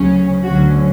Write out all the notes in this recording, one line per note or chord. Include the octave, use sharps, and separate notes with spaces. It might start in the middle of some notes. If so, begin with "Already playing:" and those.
Already playing: D2 C#3 F#3 C#4
D2 D3 F#3 C#4 F#4